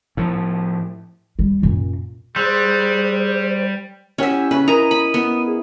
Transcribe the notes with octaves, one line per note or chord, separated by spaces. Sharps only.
A2 F3
G3
F#2 A#2
G3 G#4 C5 C6 E6 F#6
C#4 E4 G4 E5 F#5
C#3 B4
E4 A#4 D#5 A#5 D#6
B5
B3
G#4